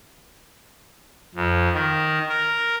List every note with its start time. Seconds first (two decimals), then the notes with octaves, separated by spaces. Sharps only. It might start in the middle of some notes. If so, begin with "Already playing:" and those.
1.35 F2
1.74 D#3
2.29 A#4